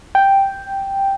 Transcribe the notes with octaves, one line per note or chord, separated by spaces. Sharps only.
G5